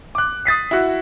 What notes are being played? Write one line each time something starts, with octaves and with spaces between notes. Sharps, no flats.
D6 F#6
D#6 A6 B6 C7
E4 F#4